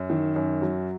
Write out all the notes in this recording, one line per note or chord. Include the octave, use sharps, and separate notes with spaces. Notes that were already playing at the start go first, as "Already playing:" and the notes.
Already playing: F#2
D#3
F#2
F#3